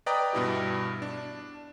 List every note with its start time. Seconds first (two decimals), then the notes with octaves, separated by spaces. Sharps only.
0.06 B4 D5 D#5 G5 A#5 D#6
0.33 G2 B2 E4 G4
1.02 D4